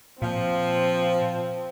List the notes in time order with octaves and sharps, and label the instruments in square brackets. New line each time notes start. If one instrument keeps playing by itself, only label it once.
[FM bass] A#2 [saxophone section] F3 [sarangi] C4